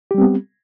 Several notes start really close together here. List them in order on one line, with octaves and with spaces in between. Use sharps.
G4 G3 C4 B3